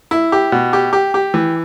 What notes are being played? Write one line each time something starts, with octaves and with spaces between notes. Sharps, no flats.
E4
G4
B2
G4
G4
G4
E3